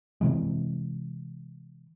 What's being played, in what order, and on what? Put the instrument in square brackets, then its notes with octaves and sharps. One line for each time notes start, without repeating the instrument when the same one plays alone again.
[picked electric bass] C3 E3 G#3